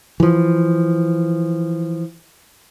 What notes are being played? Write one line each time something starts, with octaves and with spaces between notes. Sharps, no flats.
E3 F3